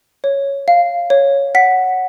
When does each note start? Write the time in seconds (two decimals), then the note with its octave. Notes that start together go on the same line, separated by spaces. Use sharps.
0.24 C#5
0.68 F5
1.10 C#5
1.55 F#5 B6